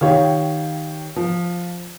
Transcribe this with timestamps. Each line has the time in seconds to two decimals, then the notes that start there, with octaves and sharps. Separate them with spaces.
0.01 D#3 G4 C#5 F5
1.16 F3